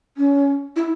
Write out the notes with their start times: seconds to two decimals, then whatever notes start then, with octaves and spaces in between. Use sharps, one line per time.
0.17 C#4
0.76 E4